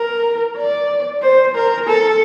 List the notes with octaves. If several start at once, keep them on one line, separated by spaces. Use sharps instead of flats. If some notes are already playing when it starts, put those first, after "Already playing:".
Already playing: A#4
D5
C5
A#4
A4